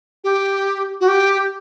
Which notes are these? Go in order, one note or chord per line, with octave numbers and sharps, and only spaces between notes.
G4
F#4
G4